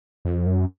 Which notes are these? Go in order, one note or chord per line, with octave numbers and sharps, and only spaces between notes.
F2
F#2